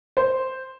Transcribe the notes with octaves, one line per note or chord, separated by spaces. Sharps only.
C5